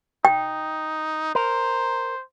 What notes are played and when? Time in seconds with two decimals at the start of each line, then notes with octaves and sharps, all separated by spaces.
0.25 D#4 G5
1.35 A#4 C5